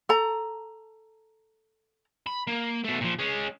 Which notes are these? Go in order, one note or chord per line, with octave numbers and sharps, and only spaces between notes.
A4 A#5
B5
A#3
B2 A3
A#2 F3
G#3 C#4